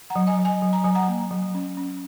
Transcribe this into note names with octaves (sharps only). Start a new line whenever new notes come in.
F#5 A#5
F#3
D#5 G#5
F#3
D#5 G#5
F#3
A#5
F#3 G#5
F#5 A#5
A#3
F#3
C#4
C#4